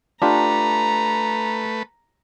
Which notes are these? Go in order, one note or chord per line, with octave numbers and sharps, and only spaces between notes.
A3 D4 F4 G4 B4 A#5